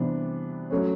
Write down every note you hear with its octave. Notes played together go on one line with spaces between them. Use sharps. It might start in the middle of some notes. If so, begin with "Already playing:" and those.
Already playing: C3 E3 G3 B3 D4
F#3 A3 C#4